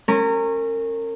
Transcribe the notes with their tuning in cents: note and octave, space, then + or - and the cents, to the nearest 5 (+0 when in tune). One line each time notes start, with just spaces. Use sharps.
C#4 -25 A#4 -30